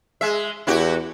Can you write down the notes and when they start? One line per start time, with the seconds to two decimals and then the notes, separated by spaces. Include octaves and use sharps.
0.21 G#3 E5
0.67 E2 E4 F#4 G4